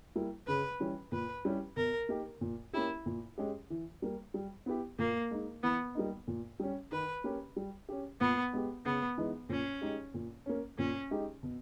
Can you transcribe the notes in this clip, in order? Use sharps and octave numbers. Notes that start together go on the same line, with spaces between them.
G3 A#3 E4
C#3 B4
E3 G3 C#4
A#2 B4
G3 C#4 E4 G4
B2 A#4
A#3 D#4 G4
A#2
A#3 C#4 E4 G4
A#2
G#3 C#4 G4
E3
G3 A#3
G3
B3 E4 G4
A#2 A#3
G#3 D#4
E3 B3
G3 A#3 D#4
A#2
G3 C#4
D#3 B4
A#3 C#4 G4
G3
C#4 G4
A#2 B3
G#3 B3 G4
C#3 B3
E3 G#3 B3 D#4
A#2 C#4
G#3 D#4 G4
A#2
A#3 C#4
A#2 C#4
G#3 D#4 G4
B2